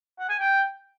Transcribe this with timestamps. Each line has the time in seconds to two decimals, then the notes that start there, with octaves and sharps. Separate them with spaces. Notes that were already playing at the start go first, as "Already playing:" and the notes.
0.19 F#5
0.29 G#5
0.39 G5